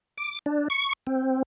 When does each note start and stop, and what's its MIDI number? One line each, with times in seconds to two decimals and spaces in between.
0.18 0.39 86
0.46 0.68 62
0.70 0.93 85
1.07 1.43 60